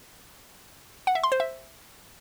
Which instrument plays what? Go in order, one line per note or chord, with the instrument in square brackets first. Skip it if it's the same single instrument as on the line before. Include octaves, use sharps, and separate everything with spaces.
[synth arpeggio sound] F#5
E5
C6
C5
E5